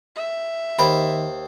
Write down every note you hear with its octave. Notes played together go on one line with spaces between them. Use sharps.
E5
D#2 D#3 C5 B5